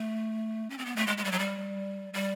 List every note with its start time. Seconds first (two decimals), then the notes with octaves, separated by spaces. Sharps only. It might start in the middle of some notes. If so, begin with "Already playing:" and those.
Already playing: A3
0.70 C#4
0.78 C4
0.86 B3
0.96 A3
1.07 G#3
1.18 G#3
1.24 G3
1.32 F#3
1.39 G3
2.14 G3